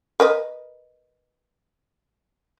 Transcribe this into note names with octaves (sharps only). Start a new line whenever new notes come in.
A#4 B4 D#5